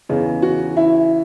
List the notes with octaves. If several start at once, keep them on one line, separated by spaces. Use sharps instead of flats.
E2 C#3 E3
F#4
E4